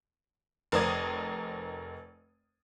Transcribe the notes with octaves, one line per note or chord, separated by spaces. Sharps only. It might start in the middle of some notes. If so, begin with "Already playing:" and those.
F1 A#4 C5 D5 D#6 G#6